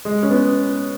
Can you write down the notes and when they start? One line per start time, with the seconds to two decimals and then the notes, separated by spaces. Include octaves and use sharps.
0.05 G#3
0.23 C#4
0.30 B3